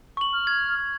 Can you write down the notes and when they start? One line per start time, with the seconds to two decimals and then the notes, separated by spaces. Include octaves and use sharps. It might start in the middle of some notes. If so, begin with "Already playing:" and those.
0.17 C#6 F#7
0.33 F6
0.47 G#6